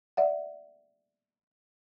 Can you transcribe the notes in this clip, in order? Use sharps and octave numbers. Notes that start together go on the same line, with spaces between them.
D5 E5 F#5